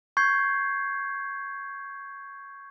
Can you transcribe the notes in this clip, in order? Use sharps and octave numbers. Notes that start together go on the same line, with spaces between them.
C#6 G6 G#6 C7